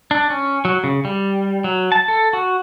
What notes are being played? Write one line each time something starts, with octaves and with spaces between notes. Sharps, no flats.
D4
C#4
F#3
C#3
G3
F#3
A5
A4
F#4